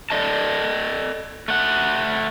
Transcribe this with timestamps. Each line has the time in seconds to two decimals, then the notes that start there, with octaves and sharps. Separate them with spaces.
0.10 A4 D5 D#5 A5
1.48 A3 F#5